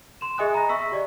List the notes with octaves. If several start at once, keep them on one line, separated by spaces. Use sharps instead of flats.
C6 E7
G#4 D#5 E5 G#5 D#6 F#6
A#5 B5 A#6
E5 C#6 E6 B6
G4 D5 D#5